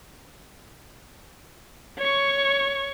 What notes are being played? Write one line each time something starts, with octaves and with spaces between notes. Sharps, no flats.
C#5 C#6